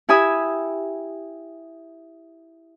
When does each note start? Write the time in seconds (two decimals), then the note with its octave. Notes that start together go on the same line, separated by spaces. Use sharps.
0.09 E4 G4 G#5 B5 D#6 E6